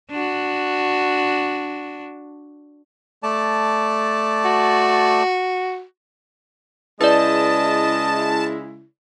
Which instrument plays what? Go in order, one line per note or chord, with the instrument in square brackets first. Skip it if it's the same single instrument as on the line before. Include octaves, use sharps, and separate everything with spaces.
[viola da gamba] D4 F#4
[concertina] A3 D5 A5
[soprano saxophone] F#4
[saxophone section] C#3 G#3 E4 [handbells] B4 D5 [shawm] D#5 [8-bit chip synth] A5